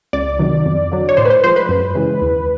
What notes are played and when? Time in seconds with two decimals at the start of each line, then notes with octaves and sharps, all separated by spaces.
0.13 C#2 D5
0.39 C3 D#3 F#3
0.66 F2
0.92 D3 F#3
1.09 C#5
1.17 A2 C5
1.25 B4
1.30 C5
1.44 F3 G#3 C5
1.56 B4
1.69 F#2
1.95 C#3 E3 G#3
2.22 D#2